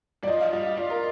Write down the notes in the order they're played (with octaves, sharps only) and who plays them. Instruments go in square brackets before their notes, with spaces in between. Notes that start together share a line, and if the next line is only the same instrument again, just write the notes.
[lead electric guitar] G3 [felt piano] D5
[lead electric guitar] F3 [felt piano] D#5
[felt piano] F5
[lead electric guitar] G3 [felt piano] D#5
[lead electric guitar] F4 [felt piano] D5
[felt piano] A#4